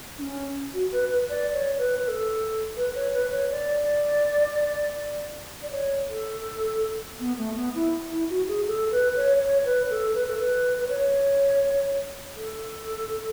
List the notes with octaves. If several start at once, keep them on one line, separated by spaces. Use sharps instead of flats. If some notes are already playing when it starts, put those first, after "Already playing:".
D4
C#4
F#4
B4
B4
D5
C#5
B4
B4
A4
B4
C#5
B4
C#5
D5
D5
C#5
A4
B3
A3
B3
E4
E4
F#4
G#4
A4
B4
C#5
C#5
B4
A4
B4
A4
B4
B4
C#5
A4